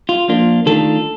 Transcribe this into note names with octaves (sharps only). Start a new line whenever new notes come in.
F4
F3 A#3 D4 F4
D#3 A3 D4 F4 A4